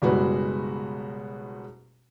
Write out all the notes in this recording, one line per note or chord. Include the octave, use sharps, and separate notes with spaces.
F#1 B2 G3 G#3 F#4 B4